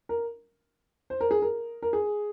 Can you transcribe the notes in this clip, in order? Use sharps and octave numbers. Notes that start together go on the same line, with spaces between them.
A#4
C5
A#4
G#4
A#4
A#4
G#4